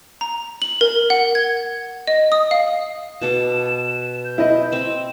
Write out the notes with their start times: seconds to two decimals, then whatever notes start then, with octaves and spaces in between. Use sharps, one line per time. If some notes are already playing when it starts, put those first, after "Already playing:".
0.21 A#5
0.62 F#7
0.81 A#4
1.10 F#5
1.35 G#6
2.08 D#5
2.32 D#6
2.51 F5
3.22 B2 A4 D6 E7
4.25 G6
4.38 E4 D#5
4.72 C4 B5 E7